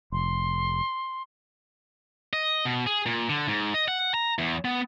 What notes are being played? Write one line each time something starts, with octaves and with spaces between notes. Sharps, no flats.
F1 C6
D#5
B2
G#4
A#2
D3
G#2
D#5
F#5
A#5
E2
B3